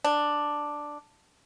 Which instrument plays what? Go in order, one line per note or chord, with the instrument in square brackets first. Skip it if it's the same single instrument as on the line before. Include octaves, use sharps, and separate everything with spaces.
[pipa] D4